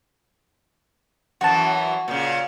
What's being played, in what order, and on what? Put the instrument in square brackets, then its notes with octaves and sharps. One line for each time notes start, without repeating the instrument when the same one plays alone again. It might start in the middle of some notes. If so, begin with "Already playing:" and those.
[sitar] F#2 E3 F#3 [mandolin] F#4 A5
[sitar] A#2 C#3